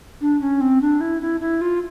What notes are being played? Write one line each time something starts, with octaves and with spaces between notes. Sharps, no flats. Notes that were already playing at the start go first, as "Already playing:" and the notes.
D4
C#4
C4
D4
E4
E4
E4
F4